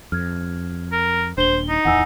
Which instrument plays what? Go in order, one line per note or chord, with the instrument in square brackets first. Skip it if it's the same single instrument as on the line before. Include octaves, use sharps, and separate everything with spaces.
[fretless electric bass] F2 [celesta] F6 G#6
[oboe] A#4
[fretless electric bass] D#1 [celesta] D4 G7 [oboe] C5
[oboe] D#4
[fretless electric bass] D1 E2 E3 [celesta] F#5 G#5 E6